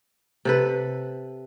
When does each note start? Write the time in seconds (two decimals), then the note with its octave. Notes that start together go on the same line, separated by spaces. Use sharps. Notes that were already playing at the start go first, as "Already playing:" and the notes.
0.45 C3 A4 B4